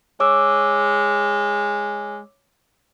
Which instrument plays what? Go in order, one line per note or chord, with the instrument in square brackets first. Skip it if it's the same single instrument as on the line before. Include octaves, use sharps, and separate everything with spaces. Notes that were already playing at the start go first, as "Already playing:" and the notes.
[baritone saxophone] G#3 [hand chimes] C#5 D6 E6